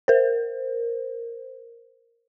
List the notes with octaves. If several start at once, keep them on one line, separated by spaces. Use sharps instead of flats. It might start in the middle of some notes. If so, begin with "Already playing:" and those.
A#4 C5